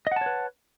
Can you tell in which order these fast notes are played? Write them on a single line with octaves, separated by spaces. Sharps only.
D#5 F#5 A5 C#5 B4